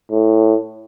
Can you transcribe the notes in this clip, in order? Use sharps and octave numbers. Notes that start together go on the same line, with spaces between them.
A2